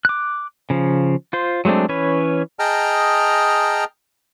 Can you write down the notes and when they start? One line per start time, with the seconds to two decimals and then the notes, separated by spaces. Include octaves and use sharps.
0.05 D6 F#6
0.70 C#3 F3
1.33 F4 C5
1.65 F#3 G#3 A3 C4 D4
1.89 E3 C#4 B4 C#5
2.59 G#4 D#5 G5 A5 A#5 F6